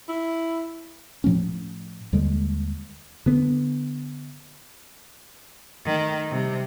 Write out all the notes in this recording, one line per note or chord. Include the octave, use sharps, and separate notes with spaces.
E4
A2 F3 A3 C#4
D#2 D3 G3 G#3
D3 B3
D#3 A3
C3 G3